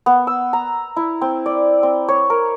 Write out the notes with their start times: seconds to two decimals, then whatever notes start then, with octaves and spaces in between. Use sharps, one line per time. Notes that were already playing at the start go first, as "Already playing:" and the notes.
0.06 B3
0.27 E6
0.53 A#5
0.97 E4
1.21 C4
1.46 D5
1.83 C4
2.08 C#5
2.30 A#4